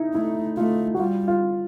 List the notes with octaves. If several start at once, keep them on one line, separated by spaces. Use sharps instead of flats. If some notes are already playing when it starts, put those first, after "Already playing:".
Already playing: D#4 E4
A3 E4
A3 F4
F#4
G3 F4
F4